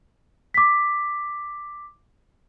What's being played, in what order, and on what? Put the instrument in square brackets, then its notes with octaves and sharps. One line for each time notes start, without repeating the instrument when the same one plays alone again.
[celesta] D6 B6